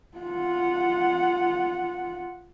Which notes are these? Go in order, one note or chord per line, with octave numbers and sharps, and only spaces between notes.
F4 F#5